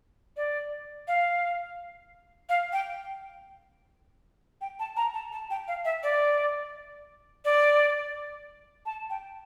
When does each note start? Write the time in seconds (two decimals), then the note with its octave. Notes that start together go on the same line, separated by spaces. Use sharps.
0.37 D5
1.08 F5
2.49 F5
2.73 G5
4.61 G5
4.79 A5
4.97 A#5
5.14 A5
5.32 A5
5.50 G5
5.68 F5
5.85 E5
6.03 D5
7.45 D5
8.86 A5
9.10 G5